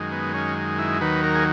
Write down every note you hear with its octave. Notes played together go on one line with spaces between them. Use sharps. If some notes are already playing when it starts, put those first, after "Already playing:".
Already playing: F#2 D#3 G#3
B3
C#4
E4
D#2 D#3 F#3 B4
A#4
G#4